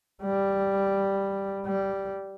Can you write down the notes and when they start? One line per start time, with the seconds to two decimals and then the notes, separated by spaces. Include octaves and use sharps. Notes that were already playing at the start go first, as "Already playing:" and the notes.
0.23 G3
1.66 G3